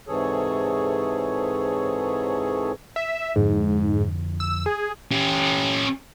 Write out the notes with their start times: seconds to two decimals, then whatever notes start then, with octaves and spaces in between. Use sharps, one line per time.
0.08 G#2 C3 E3 G#4 A4 C#5
2.96 E5
3.36 F2 G#2 D3 F3
4.40 E6
4.66 G#4
5.11 C#4 G4